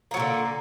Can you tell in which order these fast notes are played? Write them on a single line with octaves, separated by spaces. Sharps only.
A#3 F#3 A#2 D3